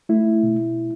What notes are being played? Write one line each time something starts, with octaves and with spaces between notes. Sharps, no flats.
A3 E4
B2